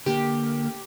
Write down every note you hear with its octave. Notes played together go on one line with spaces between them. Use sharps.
D3 A#3 G4